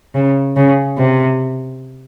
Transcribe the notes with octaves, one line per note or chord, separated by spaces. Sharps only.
C#3
C#3
C3